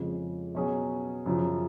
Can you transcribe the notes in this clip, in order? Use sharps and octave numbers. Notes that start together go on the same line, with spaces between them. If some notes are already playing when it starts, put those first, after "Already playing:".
Already playing: F2 C#3 F3 G#3
B2 F#3 C#4 G#4
F#2 C#3 F3